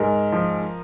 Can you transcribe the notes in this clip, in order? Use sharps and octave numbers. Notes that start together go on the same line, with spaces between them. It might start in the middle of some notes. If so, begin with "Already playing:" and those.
Already playing: G#2 A#4
F3